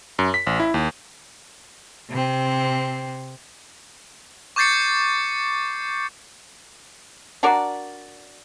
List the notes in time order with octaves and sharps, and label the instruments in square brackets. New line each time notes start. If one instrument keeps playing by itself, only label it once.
[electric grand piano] F#2
B6
A1
E4
D#2
[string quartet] C3 C4
[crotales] C#6 D6 G6 A6 C7 C#7
[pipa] D4 F#4 A#4 D5